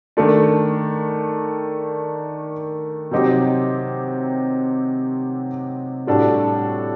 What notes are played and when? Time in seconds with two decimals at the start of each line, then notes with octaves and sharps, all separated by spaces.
0.17 D#3 A3 D4
3.11 C3 F#3 C4 D#4 G4
6.07 A2 G3 D4 F#4 A4